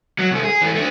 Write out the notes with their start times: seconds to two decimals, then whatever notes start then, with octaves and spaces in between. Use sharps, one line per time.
0.19 F#3
0.31 C2 A3
0.44 G#4
0.62 E3 A3
0.75 A3 D4